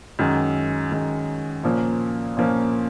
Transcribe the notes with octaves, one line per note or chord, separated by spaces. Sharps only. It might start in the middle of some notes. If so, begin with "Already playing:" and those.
F#2 D#3 G#3
F#2 D#3 G#3
A#2 F3 A#3 C#4
A#2 F3 A#3 C#4